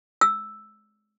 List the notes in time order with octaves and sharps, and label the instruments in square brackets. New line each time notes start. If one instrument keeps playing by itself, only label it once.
[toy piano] E6